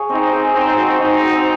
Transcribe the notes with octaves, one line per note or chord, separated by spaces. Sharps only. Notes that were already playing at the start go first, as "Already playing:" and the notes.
Already playing: G#4 C#5 F5
C4 C#4 D#4
G#4 C#5 F5
G#3 C4 D#4
C#4 F#4 C5
G#3 C4 D#4
C#4 F#4 C5